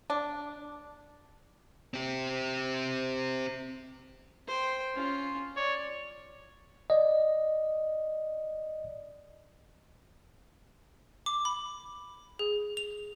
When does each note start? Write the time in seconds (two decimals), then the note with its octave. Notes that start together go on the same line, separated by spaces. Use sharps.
0.10 D4
1.94 C4 G4
4.48 C5 G5
4.95 C#4 F4
5.56 C#5 D5
6.90 D5 D#5
11.26 D6
11.45 B5
12.39 G#4
12.77 F7